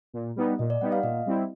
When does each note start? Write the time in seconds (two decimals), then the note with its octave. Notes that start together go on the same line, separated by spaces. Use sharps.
0.13 A#2
0.36 G3 B3 D#4
0.59 A#2 D#5
0.70 D5
0.81 G3 B3 D#4 F#5
0.92 F5
1.03 A#2 D#5
1.26 G3 C4 E4